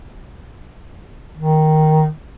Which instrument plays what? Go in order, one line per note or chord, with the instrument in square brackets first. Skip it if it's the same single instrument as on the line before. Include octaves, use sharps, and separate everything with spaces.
[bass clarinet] D#3